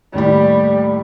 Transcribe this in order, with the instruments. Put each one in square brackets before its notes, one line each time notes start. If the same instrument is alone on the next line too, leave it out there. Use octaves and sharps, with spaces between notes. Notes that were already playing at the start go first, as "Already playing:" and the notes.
[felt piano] D#2 A2 B5 [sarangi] G3